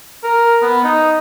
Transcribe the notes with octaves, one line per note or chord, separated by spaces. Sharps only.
A#4
B3
D#4